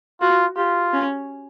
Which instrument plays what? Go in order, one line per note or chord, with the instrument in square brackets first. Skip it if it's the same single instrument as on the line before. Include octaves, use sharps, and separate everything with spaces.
[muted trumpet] F4 [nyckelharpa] F#4
[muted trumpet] F4 [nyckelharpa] G4
[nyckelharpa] C#4